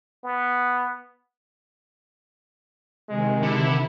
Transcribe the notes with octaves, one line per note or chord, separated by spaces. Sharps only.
B3
C3 D#3 G#3
D3 E4